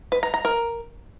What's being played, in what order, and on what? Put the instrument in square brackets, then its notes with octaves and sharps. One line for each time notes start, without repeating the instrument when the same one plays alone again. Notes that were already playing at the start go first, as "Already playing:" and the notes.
[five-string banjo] B4
A#5
A#5
A#4